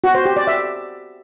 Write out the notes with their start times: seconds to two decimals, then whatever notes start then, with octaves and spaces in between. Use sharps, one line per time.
0.04 F#4
0.15 C5
0.26 G4
0.36 D5
0.47 E5